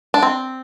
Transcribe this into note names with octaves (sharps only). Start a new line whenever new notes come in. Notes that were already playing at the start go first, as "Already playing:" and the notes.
D4
C4